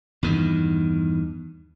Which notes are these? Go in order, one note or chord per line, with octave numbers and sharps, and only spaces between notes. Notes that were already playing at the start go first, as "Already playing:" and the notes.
E2 G2 D#3